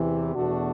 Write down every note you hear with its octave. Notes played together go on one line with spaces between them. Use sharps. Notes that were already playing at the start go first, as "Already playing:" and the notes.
Already playing: E2 C3 E3
E2 B2 A3 D4 F#4